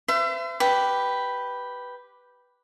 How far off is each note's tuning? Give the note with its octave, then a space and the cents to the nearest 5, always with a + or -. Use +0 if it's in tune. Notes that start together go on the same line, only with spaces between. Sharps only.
C5 -45 E5 +35
G4 -5 B4 +0